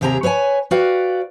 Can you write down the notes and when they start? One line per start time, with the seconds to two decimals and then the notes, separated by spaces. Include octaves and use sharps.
0.01 D#2 C3 G4 G#4 G#5 A#5
0.23 B4 C#5 E5 G#5
0.71 F#4 B4 D5 F5 G5